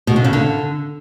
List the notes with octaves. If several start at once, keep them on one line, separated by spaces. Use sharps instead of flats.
B2
D3
C#3
D3